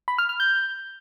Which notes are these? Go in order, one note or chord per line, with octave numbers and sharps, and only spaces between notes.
B5
F6
F6
G6